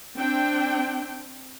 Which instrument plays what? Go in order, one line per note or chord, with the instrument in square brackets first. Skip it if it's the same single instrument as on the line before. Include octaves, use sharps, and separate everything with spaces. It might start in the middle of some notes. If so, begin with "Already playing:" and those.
[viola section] C4 D4 G5